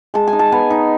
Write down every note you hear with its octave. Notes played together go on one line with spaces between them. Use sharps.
G#3 A5
G#5
D#4
A5
B3 G#5
D#4